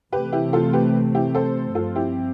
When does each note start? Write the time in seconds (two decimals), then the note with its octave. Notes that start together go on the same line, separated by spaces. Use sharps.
0.12 C3 E3 A3 C4 G4 B4
0.32 E4 G4
0.53 F4 A4
0.73 G4 B4
1.15 E4 G4
1.35 A4 C5
1.75 G2 F3 C4 F4 A4
1.95 E4 G4